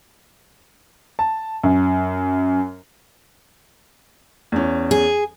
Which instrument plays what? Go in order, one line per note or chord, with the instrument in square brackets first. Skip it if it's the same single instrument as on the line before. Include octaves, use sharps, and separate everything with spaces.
[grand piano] A5
F#2
[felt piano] E2 C#4
[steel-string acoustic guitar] G#4